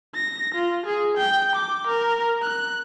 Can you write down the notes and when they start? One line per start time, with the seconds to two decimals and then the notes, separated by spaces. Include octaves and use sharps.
0.15 A#6
0.55 F4
0.86 G#4
1.17 G5
1.55 D6
1.87 A#4
2.42 F#6